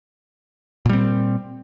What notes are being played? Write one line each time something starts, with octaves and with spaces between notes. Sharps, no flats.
A#2 G3 C4